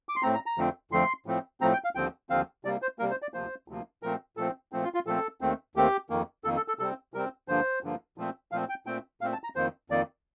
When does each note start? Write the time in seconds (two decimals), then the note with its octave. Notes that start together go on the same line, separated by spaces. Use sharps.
0.09 D6
0.16 C6
0.23 A2 A3 C4 A#5
0.34 A#5
0.46 A#5
0.58 F2 D3 F3 A3 C4
0.91 F2 D3 F3 A3 C4 C6
1.26 A2 F3 A3 C4
1.61 A2 F3 A3 C4 A#5
1.73 G5
1.84 F5
1.95 D#2 D3 F3 C4 G5
2.30 D#2 D3 F3 C4 F5
2.65 C3 G3 A#3 D5
2.82 C5
2.99 C3 G3 A#3 A#4
3.11 C5
3.22 D5
3.34 D2 C3 F3 A#3 C5
3.68 D2 C3 F3 A#3
4.03 A#2 F3 A3 C4 A#4
4.37 A#2 F3 A3 C4 A4
4.72 A#2 F3 A3 C4
4.84 F4
4.94 F4
5.06 A#2 F3 A3 C4 A4
5.41 D#2 D#3 A3 C4
5.76 D#2 D#3 A3 C4 G4
6.10 F2 D#3 A#3
6.44 F2 D#3 A#3 A4
6.57 A4
6.68 A4
6.79 C3 G3 C4 A4
7.14 C3 G3 C4 A#4
7.48 G2 D3 F3 A#3 C5
7.83 G2 D3 F3 A#3
8.18 A#2 F3 A3 C4
8.52 A#2 F3 A3 C4 F5
8.69 G5
8.86 A#2 A3 C4 G5
9.21 A#2 A3 C4 F5
9.33 A5
9.44 A#5
9.56 F2 D#3 A#3 C5
9.90 F2 D#3 A#3 D5